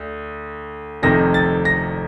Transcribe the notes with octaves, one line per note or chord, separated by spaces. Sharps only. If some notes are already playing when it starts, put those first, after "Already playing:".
Already playing: D2
F1 F2 C3 D#3 A#6
A6
A#6